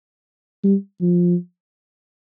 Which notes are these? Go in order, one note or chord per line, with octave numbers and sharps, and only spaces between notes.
G3
F3